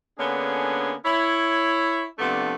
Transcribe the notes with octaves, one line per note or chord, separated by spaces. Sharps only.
D3 A#3 B3 C#4 D4 G#4
E4 C#5
C3 F3 A3 B3 D4